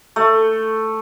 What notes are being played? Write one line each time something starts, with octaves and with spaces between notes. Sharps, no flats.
A3